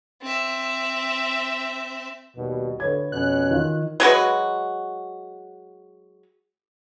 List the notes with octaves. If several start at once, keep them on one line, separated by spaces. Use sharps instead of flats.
C4 E5
D#2 B2 G3
D2 B4 C#5 G#6
F2 B2 C#4 F#6
D#3 F4
F#3 G#3 F#4 B4